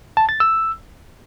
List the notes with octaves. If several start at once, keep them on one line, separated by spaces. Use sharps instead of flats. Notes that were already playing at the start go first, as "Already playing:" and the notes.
A5
A6
E6